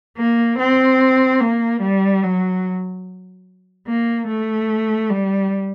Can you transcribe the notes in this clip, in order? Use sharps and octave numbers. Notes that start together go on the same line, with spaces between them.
A#3
C4
A#3
G3
F#3
A#3
A3
G3